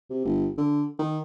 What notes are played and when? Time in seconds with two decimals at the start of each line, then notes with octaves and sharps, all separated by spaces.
0.10 C3
0.25 G1
0.58 D3
0.99 D#3